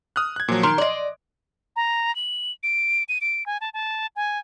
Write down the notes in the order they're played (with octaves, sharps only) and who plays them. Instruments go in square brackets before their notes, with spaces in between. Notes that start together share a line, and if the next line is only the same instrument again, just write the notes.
[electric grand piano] D#6 F6 F#6
F#6 G#6
A#2 F3 F#3
[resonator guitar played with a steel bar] D#3 [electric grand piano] C6 D7
[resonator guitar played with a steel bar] D5 D#5
[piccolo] A#5
F#7
D7
D#7
D7
G#5
A5
A5
G#5